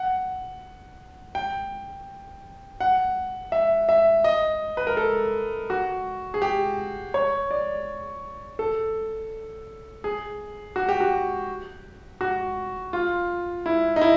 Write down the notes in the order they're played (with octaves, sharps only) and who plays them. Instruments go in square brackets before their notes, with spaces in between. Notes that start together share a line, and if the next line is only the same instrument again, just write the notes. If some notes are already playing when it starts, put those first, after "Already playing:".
Already playing: [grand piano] F#5
G5
F#5
E5
E5
D#5
B4
A#4
A4
F#4
G#4
G4
C#5
D5
A4
G#4
F#4
G4
F#4
F#4
F4
E4
D#4
E4